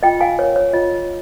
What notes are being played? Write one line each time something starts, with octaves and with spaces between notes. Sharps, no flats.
F4 D#5 G5
F5 G#5
A#4 C#5
C#5
F4 D#5